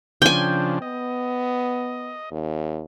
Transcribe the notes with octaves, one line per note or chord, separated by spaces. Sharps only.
C#3 F3 D4 G5 G#5
B3 D#5
D#2